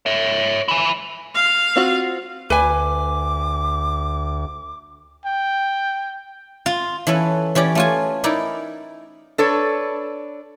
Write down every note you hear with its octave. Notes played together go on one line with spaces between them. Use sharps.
C#5 E5
E4 G#5
F5
C4 F4 F#4
D2 B4 G#5 D6
G5
F4
E3 C#4 A4 B4
E3 C#4 G4 D5
A3 F4 G#5
D#4 E4 A#4 D5 D#5
D4 A4 B4 C#5